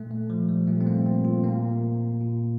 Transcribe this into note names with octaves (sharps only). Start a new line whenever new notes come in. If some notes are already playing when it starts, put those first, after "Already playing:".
Already playing: A#2 A3
A3
F3
G3
A#2 A3
C4
A#3
C4
F4
A#2 A#3
A#2